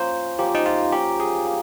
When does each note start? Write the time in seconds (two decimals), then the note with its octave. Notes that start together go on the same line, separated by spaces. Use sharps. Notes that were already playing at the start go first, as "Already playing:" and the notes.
Already playing: F3 A#3 C#4 C5
0.38 F3 A#3 C#4 G4
0.55 D#4
0.66 F4
0.92 A#3 C#4 F4 G4 A#4
1.20 G#4
1.47 A#3